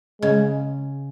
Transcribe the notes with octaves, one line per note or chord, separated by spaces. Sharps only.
C#3 G#3